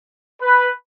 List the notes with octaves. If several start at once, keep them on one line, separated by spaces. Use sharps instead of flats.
B4